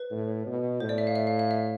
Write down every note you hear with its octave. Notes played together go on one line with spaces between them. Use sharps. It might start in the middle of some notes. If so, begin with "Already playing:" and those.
Already playing: B4
A2
B2
A2 C5
D5
E5
F5
E5
F5
F5
E5